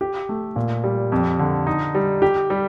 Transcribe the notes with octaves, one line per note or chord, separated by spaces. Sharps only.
G4
A3
A#2
G3
F2
D3
D#4
G3
G4
G3